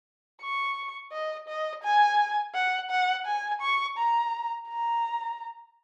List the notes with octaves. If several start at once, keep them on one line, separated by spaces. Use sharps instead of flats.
C#6
D#5
D#5
G#5
F#5
F#5
G#5
C#6
A#5
A#5